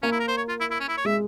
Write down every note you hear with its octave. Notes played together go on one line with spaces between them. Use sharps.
A#3 C#4
E4
A#4
C5
C#5
F4
E4
E4
C#4
E4
C#5
G#3 E5